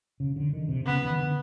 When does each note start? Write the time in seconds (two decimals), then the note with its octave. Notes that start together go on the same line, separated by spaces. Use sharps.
0.20 C#3
0.36 D3
0.53 D#3
0.69 C3
0.85 C#3 B3
1.03 D#3
1.19 D3